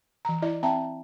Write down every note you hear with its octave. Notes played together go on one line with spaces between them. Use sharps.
E3 A#5
E4 D5 D#5
C4 E5 G5 A5 A#5